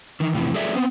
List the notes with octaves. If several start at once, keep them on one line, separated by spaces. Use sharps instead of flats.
D#3 E3
F2 A2 C3 E3
F#3 A3 G#4 A4 D5 E5
B3 C4